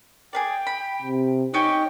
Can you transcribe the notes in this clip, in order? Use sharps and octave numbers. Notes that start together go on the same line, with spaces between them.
G#4 B4 D5 G5
B5
C3
C#4 D#4 G4 D#5 G5